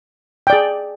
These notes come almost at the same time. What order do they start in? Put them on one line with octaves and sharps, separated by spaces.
G5 D5 G#4